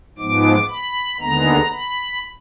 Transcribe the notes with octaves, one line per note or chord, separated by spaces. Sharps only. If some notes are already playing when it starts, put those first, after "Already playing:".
G#2 F3 G#3 B3 D6
B5
D#2 D3 G#3 B3 A#5
B5